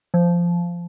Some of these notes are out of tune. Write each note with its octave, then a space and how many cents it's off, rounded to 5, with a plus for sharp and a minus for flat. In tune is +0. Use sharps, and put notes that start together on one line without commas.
F3 -10